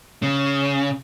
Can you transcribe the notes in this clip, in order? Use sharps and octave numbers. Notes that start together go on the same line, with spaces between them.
C#3